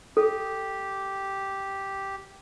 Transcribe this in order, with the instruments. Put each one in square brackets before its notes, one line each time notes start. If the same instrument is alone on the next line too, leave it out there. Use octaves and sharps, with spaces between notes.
[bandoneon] G4 [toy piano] A4